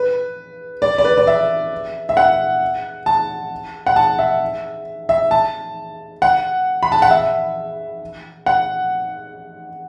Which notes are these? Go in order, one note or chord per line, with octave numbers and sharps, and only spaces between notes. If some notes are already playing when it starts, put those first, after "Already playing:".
Already playing: B4
D5
D5
B4
D5
E5
E5
F#5
A5
F#5
A5
E5
E5
A5
F#5
B5
A5
F#5
E5
F#5